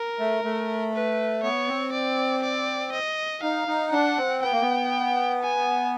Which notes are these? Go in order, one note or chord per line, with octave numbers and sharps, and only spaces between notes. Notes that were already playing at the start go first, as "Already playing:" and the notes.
Already playing: A#4
A3
A3
B4
B3 C#5
C4
D5
D5
D#5
D#4 F5
D#4
D4 F#5
C4
B3 G5
A#3
B3
G#5